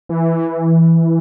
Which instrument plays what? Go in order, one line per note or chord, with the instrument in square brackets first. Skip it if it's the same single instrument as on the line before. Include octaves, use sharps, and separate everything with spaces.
[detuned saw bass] E3